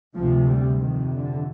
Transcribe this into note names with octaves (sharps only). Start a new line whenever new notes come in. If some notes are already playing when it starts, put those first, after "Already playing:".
D2 C3 F3
G3
F2 C3 D#3
D3